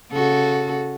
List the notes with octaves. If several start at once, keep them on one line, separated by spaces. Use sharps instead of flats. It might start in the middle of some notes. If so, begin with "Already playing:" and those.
C#3 F#4 A4